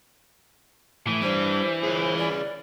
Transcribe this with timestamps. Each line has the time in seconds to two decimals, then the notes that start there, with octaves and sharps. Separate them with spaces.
1.07 A2 E3
1.22 G3 D4 C5
1.83 G#4 B4 C#5
2.17 D5